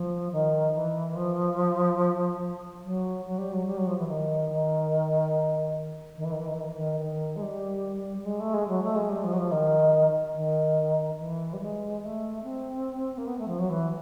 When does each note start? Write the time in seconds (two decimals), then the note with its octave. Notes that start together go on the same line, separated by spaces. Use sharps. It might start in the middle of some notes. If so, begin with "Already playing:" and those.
Already playing: F3
0.32 D#3
0.74 E3
1.15 F3
2.83 F#3
3.24 F#3
3.38 G3
3.53 F#3
3.66 G3
3.77 F#3
3.86 F3
3.98 E3
4.07 D#3
4.50 D#3
6.17 D#3
6.24 E3
6.31 D#3
6.38 E3
6.46 D#3
6.54 E3
6.60 D#3
6.68 E3
6.76 D#3
7.00 D#3
7.36 G#3
7.42 G3
8.17 G3
8.25 G#3
8.39 A3
8.53 G#3
8.68 F#3
8.82 A3
8.95 G#3
9.09 G3
9.23 F3
9.32 F#3
9.38 F3
9.51 D#3
10.35 D#3
11.18 E3
11.53 G3
11.60 G#3
12.02 A3
12.43 C4
13.17 A#3
13.27 B3
13.38 A3
13.47 F3
13.58 F#3
13.69 E3